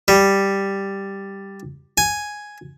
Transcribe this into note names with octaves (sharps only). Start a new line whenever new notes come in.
G3
G#5